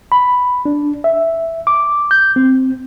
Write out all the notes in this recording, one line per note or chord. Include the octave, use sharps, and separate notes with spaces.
B5
D4
E5
D6
G6
C4